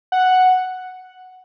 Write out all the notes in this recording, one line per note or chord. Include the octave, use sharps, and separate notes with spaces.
F#5